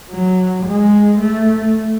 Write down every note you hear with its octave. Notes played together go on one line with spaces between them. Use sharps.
F#3
G#3
A3